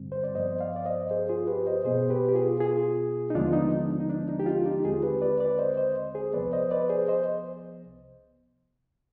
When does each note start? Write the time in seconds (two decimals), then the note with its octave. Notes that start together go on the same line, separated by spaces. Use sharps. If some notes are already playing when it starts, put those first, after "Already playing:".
Already playing: G2 D3 G3 C4
0.12 C5
0.24 D5
0.35 G2 F3 B3 C5 D#5
0.60 D5 F5
0.76 D5
0.85 C5 D#5
1.11 G#4 C5
1.29 F4 G#4
1.47 G4 B4
1.66 C5 D#5
1.85 B2 B3 G#4 C5
2.10 G4 B4
2.29 G4
2.35 F4 G#4
2.60 F4 G#4
3.30 D#4
3.34 D#2 D3 F3 G#3 B3 D4 F4
3.53 D#4
3.72 D4
4.00 D#4
4.10 D4
4.29 D#4
4.40 G4
4.46 D4 F4
4.65 D#4 G4
4.84 D#2 D3 G#3 C4 F4 G#4
5.03 G4 B4
5.22 B4 D5
5.40 B4 D5
5.59 C5 D#5
5.77 C5 D#5
6.15 G#4 C5
6.34 C2 C3 F3 B3 B4 D5
6.53 C5 D#5
6.71 B4 D5
6.89 G#4 C5
7.08 C5 D#5